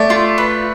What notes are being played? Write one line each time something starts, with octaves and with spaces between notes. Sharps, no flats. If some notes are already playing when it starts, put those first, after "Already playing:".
Already playing: A3 D5
F4
B4